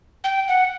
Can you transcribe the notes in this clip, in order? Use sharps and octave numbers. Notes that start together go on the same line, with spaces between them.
G5
F#5